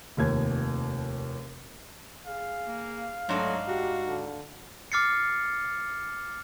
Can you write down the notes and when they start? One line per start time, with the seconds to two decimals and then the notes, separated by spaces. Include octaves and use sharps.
0.17 F1 D#2 G#6
2.27 G#4 F5
2.67 A#3
3.29 G#2 F#3 A3 D4 D#4
3.68 F#4 G4
4.07 D3
4.92 D6 F6 A6 C7 C#7